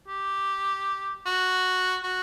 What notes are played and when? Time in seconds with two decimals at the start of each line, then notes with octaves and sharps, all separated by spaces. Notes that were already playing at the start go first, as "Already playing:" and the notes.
0.08 G4
1.26 F#4
2.03 F#4